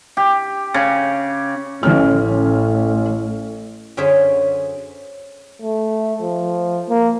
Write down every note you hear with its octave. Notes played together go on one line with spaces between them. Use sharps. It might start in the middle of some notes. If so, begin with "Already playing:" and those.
G4
C#3
A1 A2 C#4 F6
F#2 D3 C#4 G#4 C5 E5
A3
F3
A#3